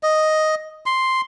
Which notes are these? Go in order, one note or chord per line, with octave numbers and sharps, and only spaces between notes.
D#5
C6